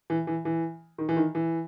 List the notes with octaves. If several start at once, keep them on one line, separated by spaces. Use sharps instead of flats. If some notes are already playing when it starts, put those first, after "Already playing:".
E3
E3
E3
D#3
E3
D#3
E3